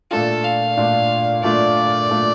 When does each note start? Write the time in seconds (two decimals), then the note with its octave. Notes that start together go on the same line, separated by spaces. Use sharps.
0.11 A#2 A3 D4 F4 A4
0.44 F5
0.77 A#2 A3 D4 F4
1.43 A#2 A3 D4 F4 D5
2.10 A#2 A3 D4 F4